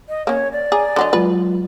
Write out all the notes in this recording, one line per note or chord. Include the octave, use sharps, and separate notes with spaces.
D#5
A#3 C#4 C#5
D5
G#4 G#5 A#5 D6
D3 F#3 D#4
F#3 G#3 F4 B4